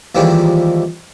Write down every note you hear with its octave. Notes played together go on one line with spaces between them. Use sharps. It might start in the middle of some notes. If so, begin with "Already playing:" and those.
D#2 E3 F3 G3 G#3